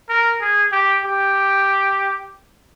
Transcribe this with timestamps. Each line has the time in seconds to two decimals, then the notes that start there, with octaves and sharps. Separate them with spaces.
0.09 A#4
0.41 G#4
0.72 G4
1.04 G4